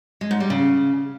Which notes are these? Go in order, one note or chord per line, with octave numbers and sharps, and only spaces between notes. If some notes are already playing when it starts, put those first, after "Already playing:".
G#3
G#2
G3
C#3